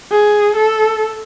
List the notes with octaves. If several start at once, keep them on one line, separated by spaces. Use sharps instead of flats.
G#4
A4